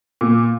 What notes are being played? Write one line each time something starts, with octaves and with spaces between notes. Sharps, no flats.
A#2